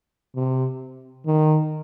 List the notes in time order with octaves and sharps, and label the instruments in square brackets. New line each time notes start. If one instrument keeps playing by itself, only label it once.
[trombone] C3
D#3